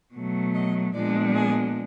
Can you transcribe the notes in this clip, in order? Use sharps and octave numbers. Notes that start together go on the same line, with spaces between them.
B2 F#3 A3
D#5
A#2 F3 G#3 B3 D4 D5
G#4